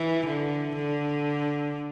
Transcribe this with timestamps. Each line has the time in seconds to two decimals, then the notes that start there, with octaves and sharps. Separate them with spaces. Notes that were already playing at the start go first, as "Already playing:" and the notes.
Already playing: E3
0.27 D3
0.76 D3